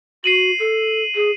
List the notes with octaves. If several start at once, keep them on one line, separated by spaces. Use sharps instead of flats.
F#4 C7 D#7 F#7
A4
G#4